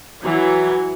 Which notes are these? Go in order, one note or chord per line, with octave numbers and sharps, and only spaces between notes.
E3 F#3